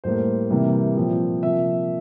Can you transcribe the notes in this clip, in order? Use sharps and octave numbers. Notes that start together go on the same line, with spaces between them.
A2 G3 A#3 C5
C3 E3 G3 A#3
A#2 F3 C4
C3 F3 A#3 E5